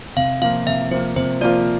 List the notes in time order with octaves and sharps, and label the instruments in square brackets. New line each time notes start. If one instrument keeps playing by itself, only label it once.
[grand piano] C3 [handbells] F5
[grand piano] F3 A#3 F4 [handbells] F5
[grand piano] C3 [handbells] E5
[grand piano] F3 A#3 F4 [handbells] C5
[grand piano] C3 [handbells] C5
[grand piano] F3 A#3 F4 [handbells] D5